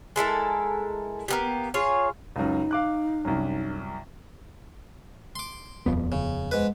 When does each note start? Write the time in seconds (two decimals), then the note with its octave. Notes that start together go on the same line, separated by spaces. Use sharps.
0.16 G#3 E4 A4 A#4
1.28 A#3 B3 G4
1.74 F4 G#4 C#5
2.36 C#2 F#2 D#4
2.71 F5 D6 F#6
3.25 C2 F#2
5.36 C6 D6
5.86 D#1 F2 B3
6.12 C#3
6.51 G#2 B4